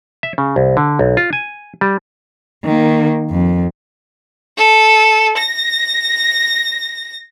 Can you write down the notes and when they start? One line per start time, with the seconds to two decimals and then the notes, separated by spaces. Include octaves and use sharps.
0.23 E5
0.38 C#3
0.56 C2
0.77 D3
0.99 B1
1.17 F4
1.33 G#5
1.81 G3
2.64 D#3 A#3
3.30 F2
4.57 A4
5.37 A#6